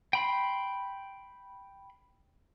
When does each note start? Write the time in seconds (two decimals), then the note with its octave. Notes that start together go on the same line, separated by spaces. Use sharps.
0.13 G5 B5 C6